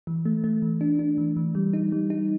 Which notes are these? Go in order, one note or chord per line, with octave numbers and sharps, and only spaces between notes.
E3
A3
A3
E3
D4
D4
E3
E3
G3
D#4
G3
D#4